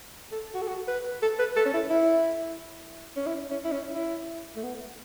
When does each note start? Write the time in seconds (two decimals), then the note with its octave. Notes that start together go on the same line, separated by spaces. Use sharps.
0.32 A4
0.54 F#4
0.62 A4
0.68 F#4
0.88 B4
1.22 A4
1.39 B4
1.56 A4
1.65 C#4
1.74 E4
1.90 E4
3.16 C#4
3.26 E4
3.50 C#4
3.64 E4
3.72 C#4
3.95 E4
4.56 A3
4.63 B3